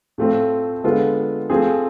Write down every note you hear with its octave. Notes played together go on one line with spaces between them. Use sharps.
A2 F3 A3 C4
D3 G#3 B3 F4 A4
F3 A3 C4 G#4